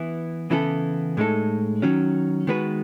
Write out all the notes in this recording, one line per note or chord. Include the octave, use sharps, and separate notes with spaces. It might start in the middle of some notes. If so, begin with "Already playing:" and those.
Already playing: E3 B3 E4
C#3 E3 B3 E4 A4
A2 G#3 D#4 A4
D#3 F#3 C#4
D#3 G#3 B3 F#4 B4